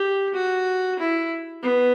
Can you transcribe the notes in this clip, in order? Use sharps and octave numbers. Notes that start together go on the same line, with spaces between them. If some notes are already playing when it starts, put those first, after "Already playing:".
Already playing: G4
F#4
E4
B3